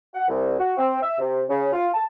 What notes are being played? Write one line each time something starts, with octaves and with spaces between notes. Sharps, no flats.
F#5
C2
F#4
C4
E5
C3
C#3
F4
A5